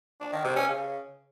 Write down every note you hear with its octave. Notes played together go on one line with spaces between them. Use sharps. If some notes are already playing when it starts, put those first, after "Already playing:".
D4
D#3
C3
C#4
C#3